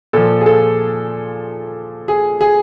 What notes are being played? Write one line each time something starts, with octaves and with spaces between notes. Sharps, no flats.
A#2 F3 A4
G#4
A4
G#4
G#4